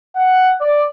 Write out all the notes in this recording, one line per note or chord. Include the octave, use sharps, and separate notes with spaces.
F#5
D5